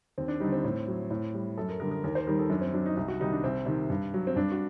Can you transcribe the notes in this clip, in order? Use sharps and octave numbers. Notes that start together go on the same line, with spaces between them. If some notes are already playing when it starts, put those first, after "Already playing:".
D#2 C4
D4
D3 G3 D#4
C4
A2
F#3
A2
G3
F#2 A4
A#4
D3 G3 A#4
A#4
D#2 A#4
C5
D#3 G3 A#4
A4
F#2 D4
C4
F#3 D4
D#4
C2 D#4
F#4
C3 D#3 G3 D#4
D4
C2 C4
C3 D#3
G2
F#3
C4
G2 D4
F#4